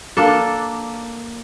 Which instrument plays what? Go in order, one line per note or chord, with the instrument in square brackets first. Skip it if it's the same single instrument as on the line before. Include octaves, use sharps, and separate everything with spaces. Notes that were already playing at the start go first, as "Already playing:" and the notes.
[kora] A#3 D4 A4